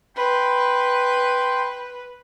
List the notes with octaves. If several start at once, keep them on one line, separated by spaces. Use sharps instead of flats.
B4 G5 B5 C6